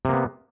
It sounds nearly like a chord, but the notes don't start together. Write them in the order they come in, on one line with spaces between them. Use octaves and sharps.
C3 A#3 B3